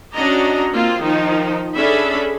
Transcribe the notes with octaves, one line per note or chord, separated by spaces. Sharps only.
C#4 D4 F#4 D#5 A#5
A#3 C4 F4
D#3 F3 D#4
C#4 D4 G#4 A4 E5 B5